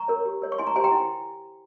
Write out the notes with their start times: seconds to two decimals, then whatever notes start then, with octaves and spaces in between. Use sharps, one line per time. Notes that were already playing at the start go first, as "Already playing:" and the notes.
Already playing: A#5 C#6
0.08 A#4 C#5
0.25 G4
0.42 A#4 C#5
0.52 C#6
0.58 E4 G#5 C6
0.67 A#5 C#6
0.76 G4 C5 G#5 C6
0.84 G5 A#5
0.92 E4